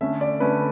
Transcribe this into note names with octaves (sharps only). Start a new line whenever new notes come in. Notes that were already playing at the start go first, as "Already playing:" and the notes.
D3 A3 C#4 E5
D5
D3 A3 C#4 B4